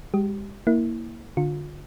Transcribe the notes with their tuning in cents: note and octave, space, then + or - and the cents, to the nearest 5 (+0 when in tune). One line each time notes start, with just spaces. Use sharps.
G#3 -45 G4 -25
A#3 +0 E4 -20
D3 +0 F4 +30